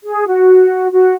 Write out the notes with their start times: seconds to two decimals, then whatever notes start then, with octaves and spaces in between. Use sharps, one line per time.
0.06 G#4
0.27 F#4
0.92 F#4